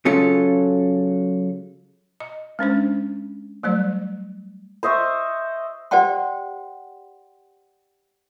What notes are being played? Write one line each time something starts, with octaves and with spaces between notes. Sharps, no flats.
C#3 F#3 C#4 F4 A4
D#5
G#3 C#4 D4 C5
F#3 G3 A3 C5 D5
C5 D#5 E5 C#6
G4 C5 D5 F#5 G5 C6